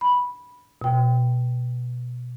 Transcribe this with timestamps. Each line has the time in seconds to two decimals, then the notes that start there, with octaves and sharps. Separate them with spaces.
0.01 B5
0.82 B2 G5